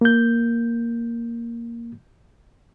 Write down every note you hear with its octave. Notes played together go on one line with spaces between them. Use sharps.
A#3 G6